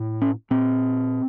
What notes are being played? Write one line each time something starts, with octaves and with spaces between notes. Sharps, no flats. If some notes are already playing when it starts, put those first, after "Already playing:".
Already playing: A2
C#4
A#2 C4